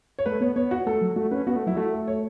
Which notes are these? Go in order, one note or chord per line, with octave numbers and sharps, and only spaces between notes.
C#5
A3 B4
B3 C#5
B3 C#5
F#4
A3 A4
F#3
A3 F#4
C#4 B4
B3 F#4
A3
F#3 E4
A3 F#4
A4
C#5